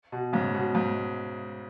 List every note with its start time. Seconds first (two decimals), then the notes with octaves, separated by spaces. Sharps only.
0.12 B2
0.33 G#2 C#3
0.54 B2
0.75 G#2